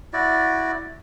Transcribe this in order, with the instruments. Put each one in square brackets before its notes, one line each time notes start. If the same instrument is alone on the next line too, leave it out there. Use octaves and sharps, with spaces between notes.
[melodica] E4 F#4 D5